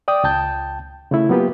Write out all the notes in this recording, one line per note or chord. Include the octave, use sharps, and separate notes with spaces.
D5 G5 D#6
C#2 G5 A5 G6
C#3 A3 E4
F#3 A#3 B3 F4 G4 B4